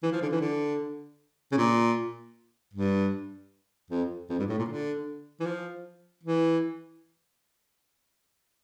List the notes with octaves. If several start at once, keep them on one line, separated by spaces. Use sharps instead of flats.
E3
F3
D3
E3
D3
C#3
A#2
G2
F2
F2
G2
A2
A#2
D3
E3
F3
E3